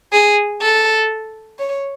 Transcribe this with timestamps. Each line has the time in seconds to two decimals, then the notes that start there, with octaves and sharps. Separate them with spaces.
0.12 G#4
0.62 A4
1.59 C#5